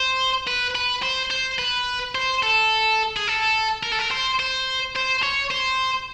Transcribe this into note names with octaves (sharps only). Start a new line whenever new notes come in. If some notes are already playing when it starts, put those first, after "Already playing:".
Already playing: C5
B4
B4
C5
C5
B4
C5
A4
G#4
A4
A#4
A4
A#4
C5
C5
C5
C#5
C5